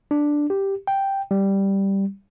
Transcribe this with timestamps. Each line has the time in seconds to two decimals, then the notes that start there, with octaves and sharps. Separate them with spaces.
0.11 D4
0.50 G4
0.87 G5
1.31 G3